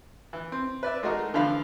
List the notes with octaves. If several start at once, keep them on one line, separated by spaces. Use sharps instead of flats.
E3
C4
B4 D5 E5
G#3 A3 D#4 F#4 G#4 A#4
D3 E3 F3 E5 F5 B5